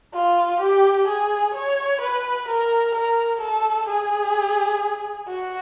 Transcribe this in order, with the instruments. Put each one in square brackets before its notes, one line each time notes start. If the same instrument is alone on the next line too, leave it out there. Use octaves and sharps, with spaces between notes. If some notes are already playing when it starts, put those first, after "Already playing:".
[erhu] F4
G4
G#4
C#5
B4
A#4
A#4
A4
G#4
F#4